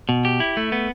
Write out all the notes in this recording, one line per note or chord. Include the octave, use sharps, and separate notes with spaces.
B2
G4
E4
A3
B3